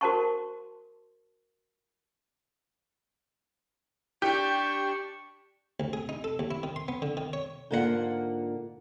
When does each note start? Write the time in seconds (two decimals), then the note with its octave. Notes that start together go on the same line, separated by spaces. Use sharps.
0.01 F#4 A#4 C5 A5 C6 C#6
4.22 D4 G4 C#6
5.80 D2
5.93 G#4
6.09 D#4
6.24 A4
6.39 D#2
6.51 E4
6.63 D#3
6.76 C6
6.88 B3
7.02 D3
7.17 D#3
7.33 C#5
7.71 G#2 D3 A#3 F4 B4 F#5